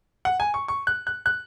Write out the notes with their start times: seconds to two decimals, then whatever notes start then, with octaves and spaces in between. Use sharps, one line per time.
0.25 F#5
0.40 G#5
0.54 C#6
0.68 C#6
0.87 F#6
1.07 F#6
1.26 F#6